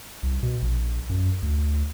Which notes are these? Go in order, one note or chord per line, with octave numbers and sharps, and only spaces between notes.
C2
B2
A#1
F#2
D2